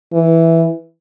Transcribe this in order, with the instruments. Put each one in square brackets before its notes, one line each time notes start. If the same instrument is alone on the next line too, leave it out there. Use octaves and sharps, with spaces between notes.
[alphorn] E3